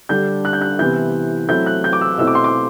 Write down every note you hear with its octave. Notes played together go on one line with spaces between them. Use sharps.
D3 G3 D4 G6
F#6
G6
F#6
C3 E3 B3 E4 G6
F#3 A3 C4 E4 G6
F#6
G6
D6
E6
B2 A3 C4 E4 E6
D6
C6
D6